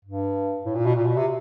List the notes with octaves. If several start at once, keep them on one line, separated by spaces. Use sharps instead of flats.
G2
A2
A#2
B2
A#2
B2
C3